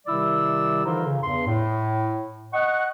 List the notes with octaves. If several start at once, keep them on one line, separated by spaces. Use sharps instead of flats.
C3 D#3 G3 E4 D5 E6
D3 E3 D#4 F4 A#4 C5
C#3
E2 G2 C6
A2
D#5 F#5 C#6